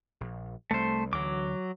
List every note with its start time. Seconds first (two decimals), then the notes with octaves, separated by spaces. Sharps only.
0.21 A#1
0.71 C2 A3 C5
1.13 D2 D3 E3 F#3 D6